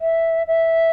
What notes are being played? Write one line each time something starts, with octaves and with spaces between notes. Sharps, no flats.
E5
E5